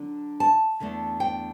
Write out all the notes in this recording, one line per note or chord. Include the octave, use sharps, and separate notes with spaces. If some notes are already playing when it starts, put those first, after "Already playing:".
Already playing: D3 F#3 D4
A5
E2 D3 A3 D4
G5